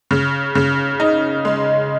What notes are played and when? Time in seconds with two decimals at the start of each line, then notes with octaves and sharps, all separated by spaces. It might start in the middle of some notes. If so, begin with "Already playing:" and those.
0.11 C#3
0.55 C#3
1.00 D#4
1.45 G#3